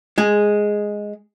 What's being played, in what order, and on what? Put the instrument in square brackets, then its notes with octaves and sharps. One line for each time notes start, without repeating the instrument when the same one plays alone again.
[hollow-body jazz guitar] G#3 G#4